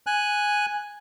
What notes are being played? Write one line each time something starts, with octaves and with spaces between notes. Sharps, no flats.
G#5 F#6